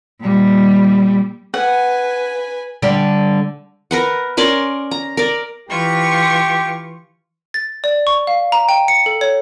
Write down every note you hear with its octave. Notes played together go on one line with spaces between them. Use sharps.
A#2 G3
B4 F#5 G#5
D3 G3 D4
A#4 B4 F#5
C#4 A#4 D5 C6
A#5
A#4 D5
E3 F4 G4 C#6
A6
D5
C#6
F5
A#5
G5
C#7
A4
C#5